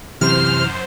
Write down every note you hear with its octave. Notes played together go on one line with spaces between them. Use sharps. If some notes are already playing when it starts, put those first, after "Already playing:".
F#2 C3 E3 C5 F6